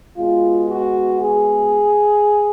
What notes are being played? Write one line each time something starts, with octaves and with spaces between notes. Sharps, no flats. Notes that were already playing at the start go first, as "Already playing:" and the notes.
B2 G#3 B3 F4
F#4
G#4